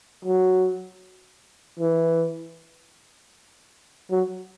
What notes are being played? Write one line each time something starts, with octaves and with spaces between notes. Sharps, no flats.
F#3
E3
F#3